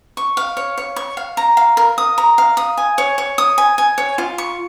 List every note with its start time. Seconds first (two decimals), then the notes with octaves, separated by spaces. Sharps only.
0.17 C#6
0.37 F5
0.57 C#5
0.78 C#5
0.96 C#6
1.17 F5
1.37 A#5
1.57 F5
1.77 A#4
1.98 D#6
2.18 A#5
2.38 F5
2.57 D#6
2.78 G#5
2.98 C#5
3.18 C#5
3.38 D#6
3.58 G#5
3.78 G#5
3.98 C#5
4.18 F4
4.38 C#6